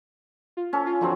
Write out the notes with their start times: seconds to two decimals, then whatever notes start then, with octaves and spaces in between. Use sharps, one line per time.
0.57 F4
0.73 C#4 A4 F5
0.86 F4
1.01 D3 F3 F#3 C4 F#4